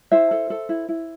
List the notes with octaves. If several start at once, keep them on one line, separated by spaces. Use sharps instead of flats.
E4 C5 E5
A4
A4
E4
E4